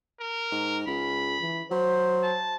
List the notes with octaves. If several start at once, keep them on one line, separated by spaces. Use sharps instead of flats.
A#4
G#2
C#2 G#4 B5
E3
F#3 C5
A5